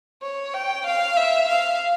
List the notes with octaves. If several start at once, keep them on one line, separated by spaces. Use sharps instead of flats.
C#5
G5
F5
E5
F5